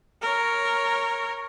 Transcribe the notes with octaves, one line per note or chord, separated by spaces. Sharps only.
A#4 C#5